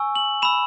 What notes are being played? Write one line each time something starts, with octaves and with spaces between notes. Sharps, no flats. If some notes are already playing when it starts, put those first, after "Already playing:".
Already playing: G#5 C#6 E6
F#7
B5 E6 E7